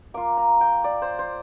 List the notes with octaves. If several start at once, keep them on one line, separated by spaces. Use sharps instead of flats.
A#3 F4 D6
A#5
G5
D5
C5
C5